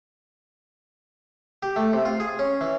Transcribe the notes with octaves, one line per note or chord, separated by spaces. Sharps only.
G4
A3
C3
F4
G#4
C#4
E3